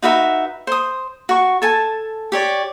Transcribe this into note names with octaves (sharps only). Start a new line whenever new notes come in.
D#4 F#4 B4 E5
C5 D#6
F#4 C#6
A4 G#5 A5
G4 C#5 D5